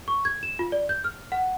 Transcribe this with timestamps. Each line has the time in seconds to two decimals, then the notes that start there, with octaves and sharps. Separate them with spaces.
0.08 C#6
0.25 G#6
0.43 E7
0.59 F4
0.72 D5
0.89 G6
1.04 F6
1.32 F#5